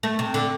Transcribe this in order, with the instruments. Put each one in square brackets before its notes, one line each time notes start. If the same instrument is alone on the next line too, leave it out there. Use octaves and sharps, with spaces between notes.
[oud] A3
C3
D3